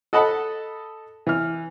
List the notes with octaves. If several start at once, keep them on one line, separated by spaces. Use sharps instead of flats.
A4 D#5 F#5 A5 B5
E3 F6